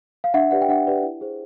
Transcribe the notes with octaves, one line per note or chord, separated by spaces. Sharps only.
F5
D4 E5 F#5
G4 B4 D5 F#5
G5
D4 E5 F#5
G4 B4 D5
E4
G#4 C5